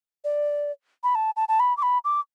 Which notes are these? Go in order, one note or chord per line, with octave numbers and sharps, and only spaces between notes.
D5
B5
A5
A5
A5
B5
D6
B5
D6